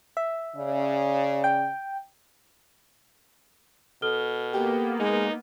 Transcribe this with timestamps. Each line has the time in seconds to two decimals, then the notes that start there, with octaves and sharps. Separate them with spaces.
0.17 E5
0.56 C#3 D5
1.44 G5
4.02 B2 A4 F6 G7
4.54 A#3 B3 G4
5.00 G#3 D#4